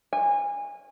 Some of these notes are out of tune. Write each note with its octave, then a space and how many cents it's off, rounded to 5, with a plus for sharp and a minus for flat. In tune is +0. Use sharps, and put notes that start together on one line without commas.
G#5 -25